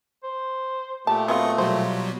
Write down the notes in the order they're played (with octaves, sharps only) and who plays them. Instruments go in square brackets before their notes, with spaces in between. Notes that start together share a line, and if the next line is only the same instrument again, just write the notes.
[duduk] C5
[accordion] A#2 A3 [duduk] G4 [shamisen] A5
[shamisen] F#3 B3 F4 [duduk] C4 [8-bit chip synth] D#5 C#6
[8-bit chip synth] B2 F#3 G3 [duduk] F4 [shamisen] C5